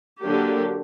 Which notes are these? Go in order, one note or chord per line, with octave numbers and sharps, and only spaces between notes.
D3 F#3 A#3 D4 G4